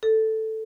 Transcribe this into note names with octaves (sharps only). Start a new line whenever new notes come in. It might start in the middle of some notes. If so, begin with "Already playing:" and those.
A4